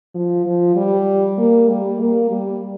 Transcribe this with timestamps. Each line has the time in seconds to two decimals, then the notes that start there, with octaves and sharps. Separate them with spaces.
0.15 F3
0.46 F3
0.76 G3
1.39 A#3
1.69 G3
2.00 A#3
2.31 G3